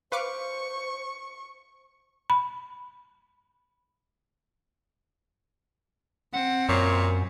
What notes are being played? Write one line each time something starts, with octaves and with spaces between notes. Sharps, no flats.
B4 C5 F5 C#6 D6
B5
C4 F#5
F#2 A#2 C#5